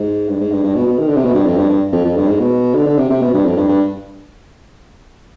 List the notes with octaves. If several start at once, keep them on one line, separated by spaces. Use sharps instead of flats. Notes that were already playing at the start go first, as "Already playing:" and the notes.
Already playing: G#2
G2
G#2
G2
G2
B2
B2
D#3
D3
C3
B2
G2
F2
G2
G2
F2
F2
G2
G#2
B2
D3
D3
C3
C3
B2
G2
F2
G2
G2